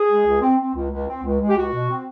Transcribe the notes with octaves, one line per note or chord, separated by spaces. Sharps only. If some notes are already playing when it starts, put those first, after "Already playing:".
Already playing: G#4
G#3
C#2
C4
C4
C#2
C#2
C4
C#2
G#3
G4
C#2 F#4
B2
C4